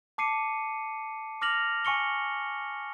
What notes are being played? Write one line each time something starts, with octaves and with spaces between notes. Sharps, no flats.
A5 D6 C7 C#7 D#7
D6 F6 A#6 F7 F#7
G#5 C#6 C#7 G7